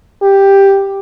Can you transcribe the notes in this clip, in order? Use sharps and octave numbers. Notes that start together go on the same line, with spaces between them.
G4